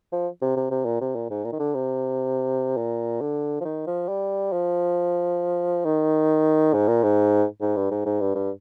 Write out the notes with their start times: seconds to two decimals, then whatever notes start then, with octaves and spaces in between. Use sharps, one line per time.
0.12 F3
0.41 C3
0.56 C3
0.71 C3
0.85 A#2
1.01 C3
1.15 A#2
1.30 G#2
1.45 A#2
1.52 D#3
1.59 D3
1.74 C3
2.77 A#2
3.21 D3
3.60 F3
3.65 D#3
3.87 F3
4.08 G3
4.52 F3
5.85 D#3
6.73 G#2
6.88 A#2
7.03 G#2
7.61 G#2
7.76 G2
7.91 G#2
8.05 G#2
8.20 G2
8.35 G2